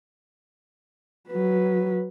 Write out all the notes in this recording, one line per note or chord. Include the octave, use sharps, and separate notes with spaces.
F#3 B4